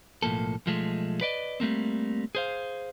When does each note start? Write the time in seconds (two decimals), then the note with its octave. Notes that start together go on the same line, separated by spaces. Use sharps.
0.22 B1 A2 F3 A#3 A4
0.66 B1 F3 G#3 A3
1.21 B4 D5 D#5
1.60 G3 A3 A#3 C4
2.35 G#4 C5 F5